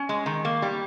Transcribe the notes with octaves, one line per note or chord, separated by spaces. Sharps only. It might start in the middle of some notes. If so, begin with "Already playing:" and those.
Already playing: C#4
G#3
D#3
A#3
G3